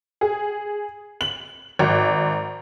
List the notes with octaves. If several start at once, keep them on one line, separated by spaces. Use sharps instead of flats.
G#4
F#7
G#1